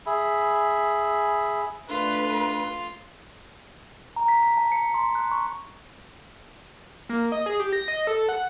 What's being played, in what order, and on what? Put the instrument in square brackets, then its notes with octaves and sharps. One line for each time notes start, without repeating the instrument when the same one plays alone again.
[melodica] G#4 E5 B5
[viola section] A3 B4 [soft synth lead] D4 [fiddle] F4
[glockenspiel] A#5
B6
B6
A5
C#7
C6
F#6
C#6
[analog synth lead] A#3
D#5
G#4
G4
A#6
D#5
A4
F#5